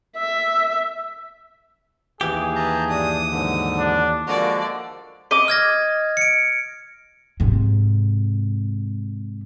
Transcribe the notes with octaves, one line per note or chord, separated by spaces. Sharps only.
E5
D#2 E3 G4 G#4
B4 A5 A#5 G6
G2 D4 D#6
G#2 D3 F#3
D4
D3 F3 G#3 A#3 F#4 D5
D#5 D6
F6 G#6 A#6
C#7 D7
G#2 C3